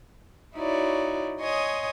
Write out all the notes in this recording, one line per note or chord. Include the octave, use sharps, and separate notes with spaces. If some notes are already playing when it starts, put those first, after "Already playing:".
D#4 E4 F#4 C#5 D5
C#5 D#5 G#5 C6 D#6